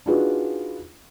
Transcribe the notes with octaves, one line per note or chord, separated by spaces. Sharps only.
D4 D#4 F4 F#4 G#4 B4